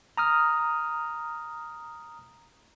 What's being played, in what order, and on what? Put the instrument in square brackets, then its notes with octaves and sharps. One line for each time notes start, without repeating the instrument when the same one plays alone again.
[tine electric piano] A#5 D#6 F6